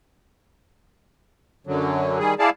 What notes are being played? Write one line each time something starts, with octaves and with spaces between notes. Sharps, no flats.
F#2 D3 F#3
D#3 G3 G#4
E4 G#4 D5 F5 A5